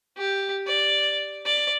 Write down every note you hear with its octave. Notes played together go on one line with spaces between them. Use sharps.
G4
D5
D5